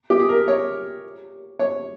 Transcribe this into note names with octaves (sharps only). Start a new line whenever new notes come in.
G4
G#4
A#4
C#5
C#5